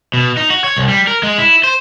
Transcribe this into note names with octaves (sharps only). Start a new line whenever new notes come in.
B2
D#4
F#4
C#5
C2
G3
A#4
G#3
E4
C5